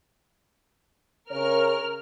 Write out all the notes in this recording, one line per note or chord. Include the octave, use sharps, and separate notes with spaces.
C#3 A#4 C#5 F6